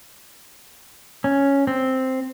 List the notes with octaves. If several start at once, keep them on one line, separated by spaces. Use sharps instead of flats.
C#4
C4